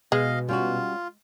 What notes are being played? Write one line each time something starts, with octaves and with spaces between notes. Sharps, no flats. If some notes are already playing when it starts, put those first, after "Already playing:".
B2 G#3 D#5 F5
G3 C#4 F4 F#4